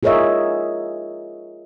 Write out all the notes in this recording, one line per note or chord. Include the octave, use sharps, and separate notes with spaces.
F4 G#4 A#4 C#5 D#5 E5